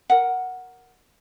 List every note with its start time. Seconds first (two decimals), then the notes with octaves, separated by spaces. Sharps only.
0.10 A#4 F#5